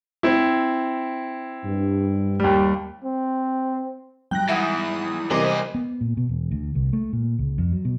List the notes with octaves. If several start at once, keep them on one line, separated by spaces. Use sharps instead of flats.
C4 E4
G2
D#2 G3
C4
G#2 F#3 G3 G5 F#6 A#6
E2 E3 E5 F#5 D#6
E2 C3 E3 G3 A#4 C5 D#5 D6
B3
A#2
B2
E1
D2
C2
A3
A#2
C#2
F2
F#3
B2